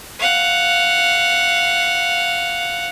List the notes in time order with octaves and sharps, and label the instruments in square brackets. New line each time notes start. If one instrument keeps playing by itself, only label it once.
[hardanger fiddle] F5 F#5